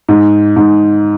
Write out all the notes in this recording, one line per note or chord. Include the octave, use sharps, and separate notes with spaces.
G#2
G#2